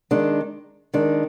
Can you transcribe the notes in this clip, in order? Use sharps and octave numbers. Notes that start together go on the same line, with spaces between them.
D#3 G#3 D4
D#3 G#3 D4